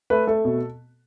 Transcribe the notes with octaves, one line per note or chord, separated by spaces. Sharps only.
A3 B4
A3 A4
B2